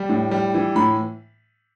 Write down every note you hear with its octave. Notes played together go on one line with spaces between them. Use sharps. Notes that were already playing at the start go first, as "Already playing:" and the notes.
Already playing: G3
A2
G3
E3
A2 B5